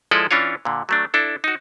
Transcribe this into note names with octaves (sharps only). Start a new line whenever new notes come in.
F3 G#3 E4 A4 D5 D#5
E3 C#4 D4 F4 C#5
A#2 D3
F#3 A3 D4
D4 E4 A4
D#4 F#4